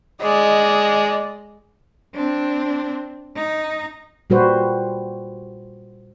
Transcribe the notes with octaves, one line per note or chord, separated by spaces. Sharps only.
G#3 D5 D#5
C4 D4
D#4
A#2 G3 F#4 B4 C5